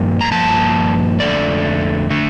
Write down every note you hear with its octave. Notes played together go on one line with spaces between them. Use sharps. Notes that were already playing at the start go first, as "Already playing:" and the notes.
Already playing: G2 F3 A#3
A#5
G2 F3 A#3 A5
F2 D3 A3 D5
D3 A3